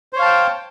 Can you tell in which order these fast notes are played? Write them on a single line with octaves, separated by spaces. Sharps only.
C5 C#5 F5 A5 G5